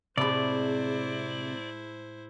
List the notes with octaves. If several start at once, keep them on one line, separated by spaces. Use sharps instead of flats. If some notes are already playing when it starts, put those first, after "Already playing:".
A2 C3 G#3 E4 C5 D5 B5